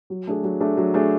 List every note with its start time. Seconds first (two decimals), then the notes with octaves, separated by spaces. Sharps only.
0.10 F#3
0.27 A3 D4 G#4
0.43 F#3
0.60 A3 D4 G#4
0.77 F#3
0.94 A3 D4 G#4